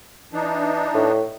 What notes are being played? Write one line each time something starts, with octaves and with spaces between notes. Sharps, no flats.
E3 D4 D#4
A2